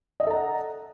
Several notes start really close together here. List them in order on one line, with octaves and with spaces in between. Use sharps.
D#5 E5 A4 A#5 F#5